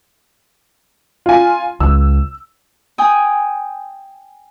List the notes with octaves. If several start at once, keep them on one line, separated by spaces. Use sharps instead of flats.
F4 G#5
C#2 E6
G5 G#5 D#6